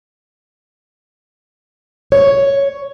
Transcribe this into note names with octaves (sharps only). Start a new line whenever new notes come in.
C#5